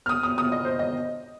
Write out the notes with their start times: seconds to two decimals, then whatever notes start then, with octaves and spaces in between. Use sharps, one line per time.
0.06 F6
0.09 D#6
0.23 D#6
0.38 D#6
0.52 D#5
0.65 C5
0.79 D#5